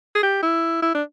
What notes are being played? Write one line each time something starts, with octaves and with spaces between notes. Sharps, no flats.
G#4
G4
E4
E4
D4